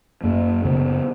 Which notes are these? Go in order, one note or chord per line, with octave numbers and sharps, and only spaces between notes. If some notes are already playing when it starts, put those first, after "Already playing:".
F#2 A#3
C#3 B3